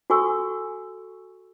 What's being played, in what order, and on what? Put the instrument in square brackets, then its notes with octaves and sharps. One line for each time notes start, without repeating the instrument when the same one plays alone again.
[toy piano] F#4 A4 G#5 C#6 E6